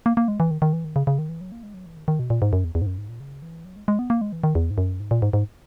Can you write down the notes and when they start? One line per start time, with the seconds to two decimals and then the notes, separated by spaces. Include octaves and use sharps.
0.06 A#3
0.17 A#3
0.28 G#3
0.40 E3
0.51 D#3
0.62 D#3
0.73 E3
0.85 D#3
0.96 C#3
1.07 C#3
1.19 D#3
1.29 E3
1.41 F#3
1.52 A#3
1.63 G#3
1.74 F#3
1.86 E3
1.97 D#3
2.08 D#3
2.19 B2
2.30 A#2
2.42 G#2
2.53 F#2
2.64 E2
2.75 E2
2.82 G#2
2.86 F#2
2.98 G#2
3.09 A#2
3.20 C#3
3.42 E3
3.65 F#3
3.76 G#3
3.88 G#3
3.99 B3
4.10 A#3
4.21 G#3
4.32 E3
4.44 D#3
4.55 E2
4.71 G#2
4.78 F#2
5.00 G#2
5.11 A#2
5.22 G#2
5.33 G#2